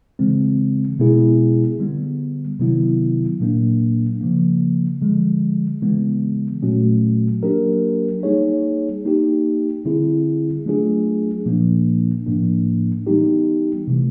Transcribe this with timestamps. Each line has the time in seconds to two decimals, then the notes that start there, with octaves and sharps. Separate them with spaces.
0.19 C#3 E3 G#3 C4
0.99 B2 G#3 B3 E4 G#4
1.79 D3 G3 B3
2.60 C3 D#3 F#3 B3 E4
3.40 A#2 F#3 A#3 D4
4.21 C#3 F3 A#3
5.02 D3 F3 G#3
5.82 C#3 E3 G#3 B3
6.62 A#2 F#3 A3 C#4 F#4
7.43 F#3 A#3 D4 G4 A#4
8.23 G3 A#3 D#4 G#4 C#5
9.05 A#3 D#4 G4
9.85 D3 G3 C4 E4 G#4
10.66 F#3 A3 D4 F4 G#4
11.46 A#2 F3 A#3 D4
12.26 A2 F3 A#3 D4
13.07 E3 G3 B3 D#4 G4
13.88 C3 E3 A3